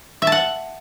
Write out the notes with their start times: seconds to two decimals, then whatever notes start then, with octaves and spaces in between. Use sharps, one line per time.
0.22 E5
0.27 A5
0.32 F#5